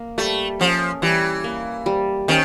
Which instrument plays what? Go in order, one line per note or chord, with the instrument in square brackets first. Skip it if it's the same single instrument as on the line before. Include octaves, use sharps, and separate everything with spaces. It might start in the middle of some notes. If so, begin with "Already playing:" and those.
Already playing: [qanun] A#3
[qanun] G3 [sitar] A3
[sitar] F3 [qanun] C#4
[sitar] E3 [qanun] G3
[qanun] A#3
G3
[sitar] D#3 [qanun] C#4